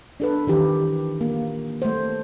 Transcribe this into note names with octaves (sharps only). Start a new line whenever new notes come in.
D4 A4 B4
D#3 E3 G4
A#3
A3 C5